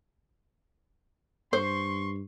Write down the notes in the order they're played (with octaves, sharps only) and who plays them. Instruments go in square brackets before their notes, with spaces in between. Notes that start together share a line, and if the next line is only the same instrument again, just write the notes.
[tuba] G2 [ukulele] C5 [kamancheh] C6 C#6